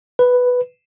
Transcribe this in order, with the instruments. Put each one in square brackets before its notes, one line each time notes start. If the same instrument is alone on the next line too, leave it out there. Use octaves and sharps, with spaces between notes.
[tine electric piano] B4